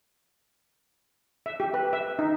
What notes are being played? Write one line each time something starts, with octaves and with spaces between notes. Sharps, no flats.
E5
G4
B4
E5
D#4